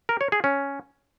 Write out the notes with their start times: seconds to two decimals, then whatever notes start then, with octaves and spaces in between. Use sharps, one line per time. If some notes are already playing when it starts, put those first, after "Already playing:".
0.09 A#4
0.21 C#5
0.32 G#4
0.44 C#4